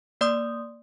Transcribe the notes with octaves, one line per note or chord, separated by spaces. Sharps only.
A#3 D5 C6 D#6